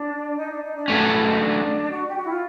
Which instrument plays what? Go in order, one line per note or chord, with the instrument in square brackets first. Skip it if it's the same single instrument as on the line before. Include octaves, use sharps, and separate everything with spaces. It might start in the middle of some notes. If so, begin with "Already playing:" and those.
Already playing: [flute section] D4
D#4
D4
D#4
D4
[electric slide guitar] F#3 A3 C#4
[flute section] E4
D#4
D4
F#4
G4
F#4
E4
F4